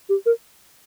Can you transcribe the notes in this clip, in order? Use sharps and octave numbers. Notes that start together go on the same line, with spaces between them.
G4
A#4